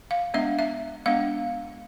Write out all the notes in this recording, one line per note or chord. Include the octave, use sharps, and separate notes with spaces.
F5
G#3 B3 D4 E5
E5
G#3 B3 D4 F5